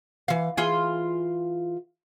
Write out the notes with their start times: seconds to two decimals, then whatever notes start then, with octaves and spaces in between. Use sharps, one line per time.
0.28 E3 F5
0.57 E3 F4 G#4